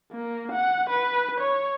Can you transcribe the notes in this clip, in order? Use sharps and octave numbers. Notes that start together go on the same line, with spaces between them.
A#3
F#5
B4
C#5